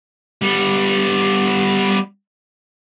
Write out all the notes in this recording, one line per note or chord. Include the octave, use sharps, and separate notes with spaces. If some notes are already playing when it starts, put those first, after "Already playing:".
G3 B3